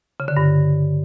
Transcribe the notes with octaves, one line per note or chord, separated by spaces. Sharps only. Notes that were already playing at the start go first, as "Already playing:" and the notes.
C#3
D3
G2